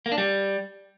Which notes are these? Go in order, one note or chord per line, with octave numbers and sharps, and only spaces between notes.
A#3
D4
G3